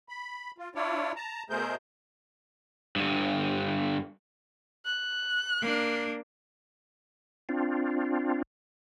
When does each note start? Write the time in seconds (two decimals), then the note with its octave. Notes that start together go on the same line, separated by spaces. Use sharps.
0.09 B5
0.58 F4
0.75 D4 E4 F4 C#5 D5
1.16 A5 A#5
1.50 B2 A3 G#4 A#4 C5 G6
2.96 G2 D3
4.85 F#6
5.60 A#3 D4
7.49 C4 D4 F4